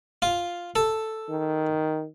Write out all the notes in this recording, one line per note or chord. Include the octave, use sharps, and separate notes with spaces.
F4
A4
D#3